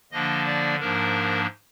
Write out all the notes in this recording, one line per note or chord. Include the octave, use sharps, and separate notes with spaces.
D3 F3 A#3 D4 D#5
D5
G#2 F3 A#3 D4 A#4